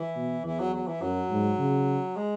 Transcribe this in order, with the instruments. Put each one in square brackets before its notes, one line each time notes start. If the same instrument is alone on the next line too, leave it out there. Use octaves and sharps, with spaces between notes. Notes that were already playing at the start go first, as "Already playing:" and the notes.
Already playing: [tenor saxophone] E3
[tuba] B2
[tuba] E2 [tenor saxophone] E3
[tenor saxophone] F#3
F#3
E3
[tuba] F#2 [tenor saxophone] F#3
[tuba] G#2
C#3
[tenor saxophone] G#3